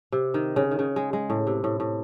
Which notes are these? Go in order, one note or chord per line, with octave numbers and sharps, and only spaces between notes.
C3
D#3
C#3
D#3
C#3
G#3
G#3
A2
C3
A2
A2